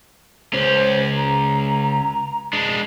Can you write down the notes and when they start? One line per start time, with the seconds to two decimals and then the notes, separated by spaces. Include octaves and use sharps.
0.53 C#2 C#4 C5
1.17 A#5
2.53 G#3 D4